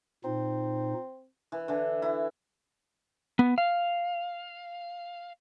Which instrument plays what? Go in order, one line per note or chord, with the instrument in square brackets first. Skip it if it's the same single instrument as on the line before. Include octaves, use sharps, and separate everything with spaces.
[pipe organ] A#2 D#4 [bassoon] C4
[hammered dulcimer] E3
D3 E3
E4
[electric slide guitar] B3
F5